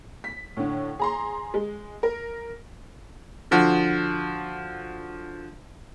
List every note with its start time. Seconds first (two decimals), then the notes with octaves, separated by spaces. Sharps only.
0.24 B6
0.57 A2 D3
0.99 G#4 A#5 C6
1.54 G#3
2.03 A#4
3.51 D3 F3 F#4